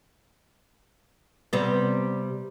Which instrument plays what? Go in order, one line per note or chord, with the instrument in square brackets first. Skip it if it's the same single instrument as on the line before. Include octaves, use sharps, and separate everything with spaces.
[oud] C3 G3 B3